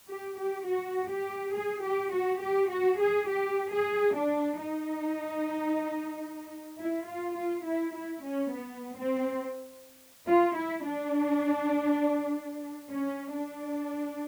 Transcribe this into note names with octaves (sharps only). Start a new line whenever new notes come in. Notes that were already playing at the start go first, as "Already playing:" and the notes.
G4
G4
F#4
G4
G#4
G4
F#4
G4
F#4
G#4
G4
G#4
D4
D#4
E4
F4
F4
E4
E4
C#4
B3
C4
F4
E4
D4
C#4
D4